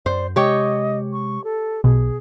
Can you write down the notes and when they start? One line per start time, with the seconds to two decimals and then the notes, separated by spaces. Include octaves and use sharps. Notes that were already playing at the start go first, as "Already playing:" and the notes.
0.06 F#2 C5 D5
0.36 C3 G#3 G4 C#5 D#5 G5
1.13 C#6
1.44 A4
1.84 B1 B2 G#4